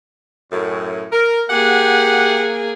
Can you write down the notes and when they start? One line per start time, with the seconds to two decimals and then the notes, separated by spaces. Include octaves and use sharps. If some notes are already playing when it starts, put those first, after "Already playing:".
0.52 F#2 A2
1.12 A#4
1.50 A#3 G4 G#4 F#5